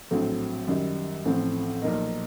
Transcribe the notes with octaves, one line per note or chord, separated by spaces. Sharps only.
A#1 A2 F#3 A3 C4
F#2 D#3 G3
A1 A2 F3 A3 C4
B1 A#2 F3 A#3 D#4